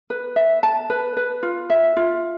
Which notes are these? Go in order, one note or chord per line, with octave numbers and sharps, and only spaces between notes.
B4
E5
A5
B4
B4
F4
E5
F4